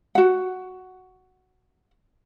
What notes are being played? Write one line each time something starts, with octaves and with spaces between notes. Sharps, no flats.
F#4 F#5